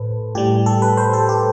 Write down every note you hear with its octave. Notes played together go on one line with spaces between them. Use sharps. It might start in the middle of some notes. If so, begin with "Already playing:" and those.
Already playing: A2 A4 B4 C5
A2 G3 G4
A4
B4
C5
A4
G4